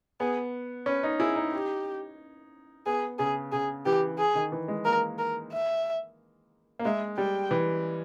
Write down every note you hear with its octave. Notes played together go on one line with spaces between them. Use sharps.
B3 G#4
C#4 B4
D#4
E4 G#4
D#4
G4
B3 G#4
C#3 G#4
C#3 G#4
E3 G4
G#4
D#3
E3
G#3
A#3 A#4
A#4
E5
A#3
G#3 E5
G3 G5
E3